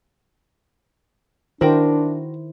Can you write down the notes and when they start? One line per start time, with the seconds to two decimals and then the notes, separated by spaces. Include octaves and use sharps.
1.61 D#3 D4 E4 F#4 A#4 C5 G5